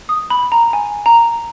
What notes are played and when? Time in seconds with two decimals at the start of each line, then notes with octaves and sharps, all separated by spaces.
0.09 D#6
0.30 B5
0.52 A#5
0.73 G#5
1.06 A#5